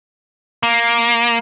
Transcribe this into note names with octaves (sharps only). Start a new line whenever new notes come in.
A#3